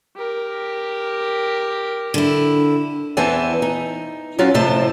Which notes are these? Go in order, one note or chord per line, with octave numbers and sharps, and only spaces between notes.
G4 A#4
D3 E4
E2 E3 B3 C4 G#5 A5
D#4
F#3 C#4 F4 F#4
F2 A2 C3 A3 C5 A5